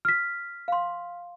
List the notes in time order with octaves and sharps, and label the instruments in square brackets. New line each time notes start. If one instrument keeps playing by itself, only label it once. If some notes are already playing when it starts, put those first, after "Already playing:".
[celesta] F6 B6
[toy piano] F5 C6